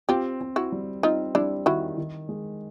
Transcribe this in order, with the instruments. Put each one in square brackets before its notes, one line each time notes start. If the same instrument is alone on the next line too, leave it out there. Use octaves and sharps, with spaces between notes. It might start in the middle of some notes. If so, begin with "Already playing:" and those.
[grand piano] C4 [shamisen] F4 G4
[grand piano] C4
[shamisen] E4 F#4
[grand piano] G3
[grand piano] C4 [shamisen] D#4 F4
[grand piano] G3 [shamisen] D4 E4
[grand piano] D#3 [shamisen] E4 F#4
[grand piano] D#3
G#3